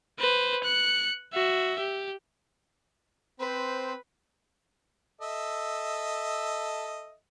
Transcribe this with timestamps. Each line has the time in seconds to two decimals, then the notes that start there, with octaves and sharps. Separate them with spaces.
0.19 B4 C5
0.64 F#6 C#7
1.33 F#4 E5
1.80 G4
3.40 C4 B4 C5
5.21 A4 D#5 E5